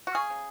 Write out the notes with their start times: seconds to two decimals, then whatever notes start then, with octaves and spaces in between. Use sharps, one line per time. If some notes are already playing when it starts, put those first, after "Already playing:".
0.07 F#4
0.15 C#3 G#4
0.30 C#3